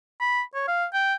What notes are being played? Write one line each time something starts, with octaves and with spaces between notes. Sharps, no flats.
B5
C#5
F5
G5